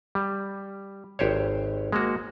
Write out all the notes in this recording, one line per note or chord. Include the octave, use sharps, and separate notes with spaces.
G3
G#1 G4 C5 C#5
G#3 A#3 F#4